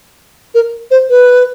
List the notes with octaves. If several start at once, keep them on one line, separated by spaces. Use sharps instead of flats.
A#4
C5
B4